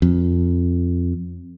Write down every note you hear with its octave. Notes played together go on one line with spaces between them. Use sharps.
F2